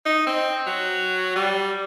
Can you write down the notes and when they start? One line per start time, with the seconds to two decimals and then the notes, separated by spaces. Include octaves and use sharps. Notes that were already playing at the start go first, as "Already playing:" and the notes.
0.06 D#4
0.27 C4
0.67 F#3
1.36 G3